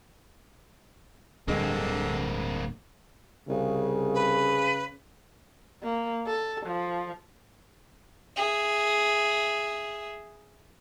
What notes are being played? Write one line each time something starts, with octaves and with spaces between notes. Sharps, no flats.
D1 G2 D3 G#3 A#3 C4
C2 C#3
B4
A#3
A4
F3
G#4 E5